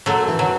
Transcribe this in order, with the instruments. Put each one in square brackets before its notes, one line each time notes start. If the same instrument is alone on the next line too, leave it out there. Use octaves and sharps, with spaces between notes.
[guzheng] F#2 [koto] F#3 A3
[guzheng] E3
[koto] F#3